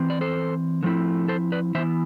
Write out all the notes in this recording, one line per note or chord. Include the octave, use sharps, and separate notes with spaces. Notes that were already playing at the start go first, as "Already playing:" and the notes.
Already playing: E3 C4
D5
A4 C5
D3 F3 A3 C4 E4
A4 C5
B4 D5
E3 B3 E4 C5 E5